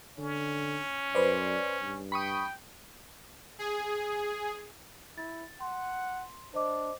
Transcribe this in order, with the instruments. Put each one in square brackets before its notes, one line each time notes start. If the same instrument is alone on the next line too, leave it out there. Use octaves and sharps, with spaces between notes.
[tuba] D3 [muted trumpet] C#4
[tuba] F#2 [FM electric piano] B4 C5 D5
[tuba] G2
[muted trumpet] G5 [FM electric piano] B5 C#6 D#6
[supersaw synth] G#4
[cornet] E4 [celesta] A6
[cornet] F#5 [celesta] C6
[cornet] D4 [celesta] C5 D#5 D6